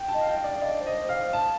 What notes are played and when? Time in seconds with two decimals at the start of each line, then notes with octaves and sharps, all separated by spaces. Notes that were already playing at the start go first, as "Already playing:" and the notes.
Already playing: G5
0.08 A5
0.14 D#5
0.21 F5
0.27 G5
0.39 F5
0.44 D5
0.62 D5 D#5
0.80 C5
0.86 D#5
0.97 C5
1.09 F5
1.16 C5
1.33 F5 A5